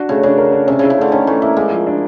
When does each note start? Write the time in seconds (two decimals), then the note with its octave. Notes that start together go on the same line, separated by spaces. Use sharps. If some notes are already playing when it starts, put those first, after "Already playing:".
Already playing: D4 F#4
0.09 C#3 A3
0.23 C#3 D4
0.38 A#4
0.53 D4
0.67 C3 C#4
0.79 C#3 E4
0.90 C#3
0.98 D3 A3
1.12 D#3 C#4
1.27 E3 A3
1.42 A#3 E4
1.57 G#3 A#3
1.72 F3
1.87 D4